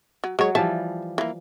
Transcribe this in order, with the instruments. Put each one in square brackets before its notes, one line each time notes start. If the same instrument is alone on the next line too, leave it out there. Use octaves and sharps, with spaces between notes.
[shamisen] F#3
[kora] F#3 F#4 [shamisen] G#3 C#5
[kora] E3 F3 G3 [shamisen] E5 A5
[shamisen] E3 A#3